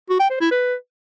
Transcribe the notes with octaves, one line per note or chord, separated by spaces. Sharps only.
F#4
G5
C5
E4
B4